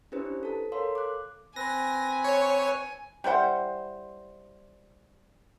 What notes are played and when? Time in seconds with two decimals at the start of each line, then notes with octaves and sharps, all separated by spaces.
0.12 C#4 D4 E4 G4 B4 C5
0.43 A4 A5
0.72 A4 A#4 C#5 F5 C6
0.95 D6 F#6
1.56 C4 B4 G#5 A#6
2.24 C#5
3.24 G3 E4 C5 F#5